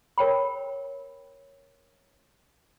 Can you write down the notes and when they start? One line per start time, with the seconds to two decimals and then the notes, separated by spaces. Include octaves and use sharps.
0.18 A#4 C#5 G5 B5